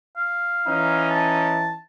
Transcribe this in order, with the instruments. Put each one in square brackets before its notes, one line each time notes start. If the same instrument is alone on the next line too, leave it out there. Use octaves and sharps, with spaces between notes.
[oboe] F5
[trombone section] E3 C#4 D#4
[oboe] A5